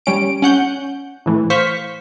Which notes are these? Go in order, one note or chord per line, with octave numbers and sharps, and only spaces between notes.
G3 C#4 D7
C#4 F#5 G6
A2 E3 A3
C5 F5 C#6 B6